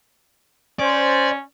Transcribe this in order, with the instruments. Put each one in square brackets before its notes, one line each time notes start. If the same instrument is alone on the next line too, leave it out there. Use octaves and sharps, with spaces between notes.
[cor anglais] C#4 [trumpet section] C5 [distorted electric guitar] D5